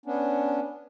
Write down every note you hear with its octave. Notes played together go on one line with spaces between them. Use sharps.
B3 C#4 D4